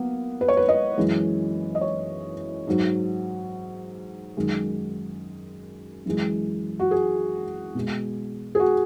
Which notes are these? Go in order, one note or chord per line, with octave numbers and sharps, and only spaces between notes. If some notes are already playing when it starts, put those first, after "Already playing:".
Already playing: F#3 A#3 B3
B4
C#5
B4
D#5
F#2 E3 G#3
D#5
C#5
G#2 F#3
F#2 D#3 G#3
F#2 E3 G#3
F#4
G#4
B2 G#3
G#4
F#4